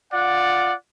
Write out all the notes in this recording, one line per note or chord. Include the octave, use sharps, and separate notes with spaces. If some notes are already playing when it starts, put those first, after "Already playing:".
F4 D5 F#5